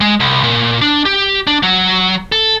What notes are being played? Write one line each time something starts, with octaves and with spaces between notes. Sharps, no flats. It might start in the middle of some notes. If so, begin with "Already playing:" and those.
G#3
C2
A#2
D4
G4
D4
F#3
A4